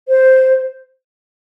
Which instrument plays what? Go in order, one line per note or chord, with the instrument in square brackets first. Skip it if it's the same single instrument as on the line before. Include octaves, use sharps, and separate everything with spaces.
[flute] C5